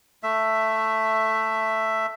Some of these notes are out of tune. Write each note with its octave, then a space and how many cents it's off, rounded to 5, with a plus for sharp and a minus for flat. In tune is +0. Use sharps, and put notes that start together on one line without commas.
A3 +0 E5 +10